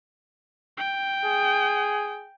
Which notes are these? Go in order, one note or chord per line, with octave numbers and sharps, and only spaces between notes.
G5
G#4